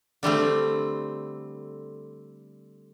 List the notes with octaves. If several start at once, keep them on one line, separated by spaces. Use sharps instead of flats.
D3 G3 A3 C4